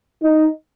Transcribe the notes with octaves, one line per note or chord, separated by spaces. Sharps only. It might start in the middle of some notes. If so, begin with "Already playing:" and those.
D#4